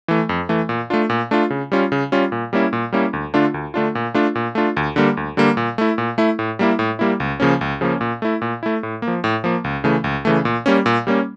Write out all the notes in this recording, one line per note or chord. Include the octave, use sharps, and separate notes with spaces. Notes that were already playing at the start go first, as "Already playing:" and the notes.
E3 A3
F2
E3 A3
A#2
A3 D4 F4
A#2
A3 D4 F4
C#3
G3 C#4 F4
C#3
G3 C#4 F4
A#2
G3 A#3 C#4 E4
A#2
G3 A#3 C#4 E4
D2
D3 A3 D4 F4
D2
D3 A3 D4 F4
A#2
A3 D4 F4
A#2
A3 D4 F4
D2
D3 G3 A#3
D2
D3 G3 A#3
A#2
A3 E4
A#2
A3 E4
A2
G3 A#3 E4
A2
G3 A#3 E4
C#2
C#3 F3 A#3 C#4
C#2
C#3 F3 A#3 C#4
A#2
A3 E4
A#2
A3 E4
A2
A#3
F3
A2
F3 A#3
C#2
C#3 E3 A3
C#2
C#3 E3 A3
A#2
G3 A#3 C#4
A#2
G3 A#3 C#4